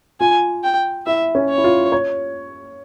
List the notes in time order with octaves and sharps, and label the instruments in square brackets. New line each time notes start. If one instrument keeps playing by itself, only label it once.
[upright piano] F4 [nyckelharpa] G#5
[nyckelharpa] G5
[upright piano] E4 [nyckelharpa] E5
[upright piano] C#4
[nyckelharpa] C#5
[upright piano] E4
F4
C#5